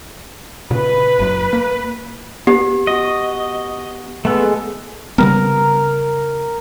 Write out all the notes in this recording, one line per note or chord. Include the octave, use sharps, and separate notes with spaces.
A#2 C#3 B4
F#1 F#2
A#3
B3 G4
F#4 D#5
G#3 A3 B3 A4
C#3 G3 B3 A#4